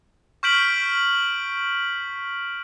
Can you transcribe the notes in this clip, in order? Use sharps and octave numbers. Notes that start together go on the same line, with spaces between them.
C#6 F6 G6 B6 D7 F#7